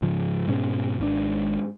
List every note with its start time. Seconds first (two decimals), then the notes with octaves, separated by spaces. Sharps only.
0.02 G#2 C#3 F3
0.47 G#2 B2 G#3 C#4
0.99 G#1 G#2 C4 D4